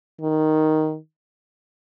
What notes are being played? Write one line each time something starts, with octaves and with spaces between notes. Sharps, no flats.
D#3